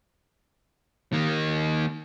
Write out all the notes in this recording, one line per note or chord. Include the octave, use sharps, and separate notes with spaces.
D#3 A#3